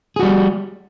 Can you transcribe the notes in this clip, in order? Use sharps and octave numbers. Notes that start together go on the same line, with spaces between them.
G3 F#4 G#4